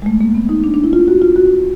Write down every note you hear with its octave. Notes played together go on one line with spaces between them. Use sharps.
G#3
A3
A#3
B3
D#4
D4
D4
E4
F4
F#4
F4
F#4